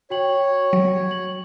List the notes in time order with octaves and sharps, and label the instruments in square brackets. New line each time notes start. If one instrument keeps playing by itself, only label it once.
[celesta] F#4 G5 F#7 [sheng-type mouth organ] C#5
[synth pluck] F#3
[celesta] F#7